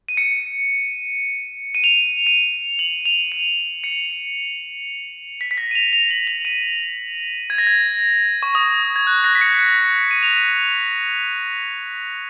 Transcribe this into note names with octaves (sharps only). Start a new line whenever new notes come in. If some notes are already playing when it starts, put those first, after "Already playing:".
D#7
C#7
D#7
F7
D#7
D#7
F#7
F7
D#7
C#7
B6
B6
A#6
D#7
F7
F7
F#7
F7
D#7
G#6
A#6
G#6
C#6
D#6
G#6
F#6
A#6
B6
C#7
C#7
D#7
F7
D#7